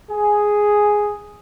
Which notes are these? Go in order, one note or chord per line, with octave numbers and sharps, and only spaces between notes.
G#4